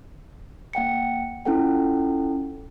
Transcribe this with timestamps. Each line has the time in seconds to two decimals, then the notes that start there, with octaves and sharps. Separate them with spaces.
0.73 A#3 F#5 G5 C#7
1.45 C#4 E4 F4 A4 F#5 G5